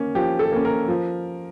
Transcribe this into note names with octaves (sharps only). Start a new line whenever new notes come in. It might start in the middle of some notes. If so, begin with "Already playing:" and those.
Already playing: A#3 C#4
F3 G4
A4
A#3 C#4
A#4
F3